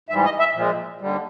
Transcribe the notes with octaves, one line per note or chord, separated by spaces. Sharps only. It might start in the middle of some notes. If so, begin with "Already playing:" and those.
G#2 E3 G3 E5
D#5
E5
A#2 F3 G#3
D#2 D3 G3